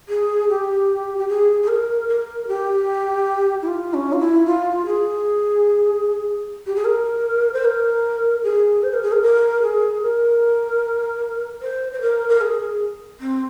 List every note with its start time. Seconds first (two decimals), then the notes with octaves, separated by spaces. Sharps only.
0.09 G#4
0.49 G4
1.18 G4
1.28 G#4
1.62 G#4
1.68 A#4
2.08 A#4
2.47 G4
3.62 E4
3.67 F4
3.94 C#4
4.12 F4
4.19 E4
4.46 F4
4.86 G#4
6.66 G4
6.75 G#4
6.84 A#4
7.53 C5
7.64 A#4
8.43 G#4
8.83 C5
8.93 A#4
9.02 G#4
9.12 A#4
9.22 A#4
9.62 G#4
10.02 A#4
11.61 C5
11.92 C5
12.01 A#4
12.28 A#4
12.41 G#4
13.20 C4